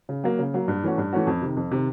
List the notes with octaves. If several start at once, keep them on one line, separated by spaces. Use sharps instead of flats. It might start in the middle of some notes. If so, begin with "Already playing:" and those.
C#3
F#3 A#3
C#3
F#3 A#3
G2
E3 A3 C#4 F#4
G2
E3 A3 C#4 F#4
F2
C3 D#3
F2
C3 D#3